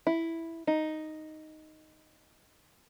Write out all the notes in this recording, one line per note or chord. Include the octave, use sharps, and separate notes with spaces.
E4
D#4